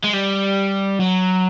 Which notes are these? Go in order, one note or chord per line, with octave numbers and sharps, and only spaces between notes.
G#3
G3
F#3